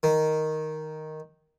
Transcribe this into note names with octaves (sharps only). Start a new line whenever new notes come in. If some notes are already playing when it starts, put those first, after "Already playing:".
D#3